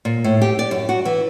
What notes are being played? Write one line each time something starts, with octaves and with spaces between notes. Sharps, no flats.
A#2
A2
G4
D5
F#2
F#4
E3